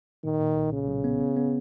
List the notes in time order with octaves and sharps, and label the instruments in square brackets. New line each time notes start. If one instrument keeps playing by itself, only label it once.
[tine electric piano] A#2 [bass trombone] D#3
[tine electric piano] A#2
B1
[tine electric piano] B1 [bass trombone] C#3
[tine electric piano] B1
B3
B3
B3